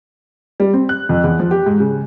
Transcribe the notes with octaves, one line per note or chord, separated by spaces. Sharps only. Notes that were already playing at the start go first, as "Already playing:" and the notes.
G3
C4
F#6
F2
E2
F3
G4
G#2
C#3